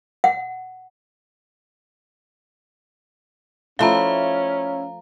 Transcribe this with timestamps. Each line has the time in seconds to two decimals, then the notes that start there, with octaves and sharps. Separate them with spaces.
0.24 F#5
3.79 F3 G3 A3 C#4 E4 F5 F#5 A#5